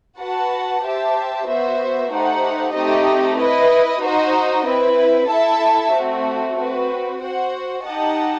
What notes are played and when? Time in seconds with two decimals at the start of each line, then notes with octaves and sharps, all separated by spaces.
0.19 F#4 B4 F#5 A5
0.83 G4 C5 E5 A5
1.47 B3 F#4 C5 E5
2.10 A3 D#4 G4 C5 F#5
2.74 A3 C4 D#4 G4 D#5
3.38 E4 B4 D#5
4.02 D#4 F#4 C5 D#5
4.66 C4 E4 B4
5.29 E4 A4 E5 A5
5.93 A3 C4 F#4
6.57 C4 F#4 B4
7.21 F#4 C5 F#5
7.85 D#4 G4 D#5 F#5 A5